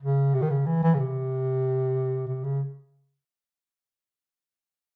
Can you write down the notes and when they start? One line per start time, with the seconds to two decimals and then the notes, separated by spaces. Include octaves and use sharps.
0.02 C#3
0.35 C3
0.42 D#3
0.50 C#3
0.66 E3
0.83 E3
0.95 C#3
1.00 C3
2.28 C3
2.44 C#3